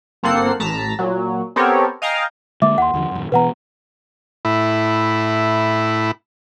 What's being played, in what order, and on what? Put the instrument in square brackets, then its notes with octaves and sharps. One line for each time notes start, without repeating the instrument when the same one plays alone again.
[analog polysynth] G1 A#3 C4 A4 F#5 C7
A1 A5 A#5 B6
A#2 F#3
B3 C4 G4 A4 A#4 C#5
D#5 F5 G5 G#5 A#5
[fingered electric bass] D3 G#3 A#3 [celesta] E5 D6
[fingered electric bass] D#2 [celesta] F#5 C6
[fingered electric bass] D#2 D3 F3
D#1 F#2
[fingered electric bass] B2 E3 B3 [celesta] B4 F#5 A#5
[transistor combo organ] A2 E4